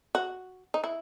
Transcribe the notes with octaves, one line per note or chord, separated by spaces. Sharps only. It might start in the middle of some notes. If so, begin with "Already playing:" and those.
F#4
D#4
E4